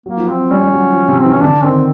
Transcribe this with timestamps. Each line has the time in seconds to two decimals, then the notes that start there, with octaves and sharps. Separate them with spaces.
0.06 F#3 A#3
0.17 F3
0.28 F#3 C4
0.51 G3 C#4
0.63 G3
0.74 F#3
0.91 F3
1.08 C3
1.20 E3 C4
1.31 C#4
1.42 D3 D4
1.64 D#3 C4